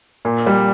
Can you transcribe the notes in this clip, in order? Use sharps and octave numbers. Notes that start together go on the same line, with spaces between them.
A#2
G3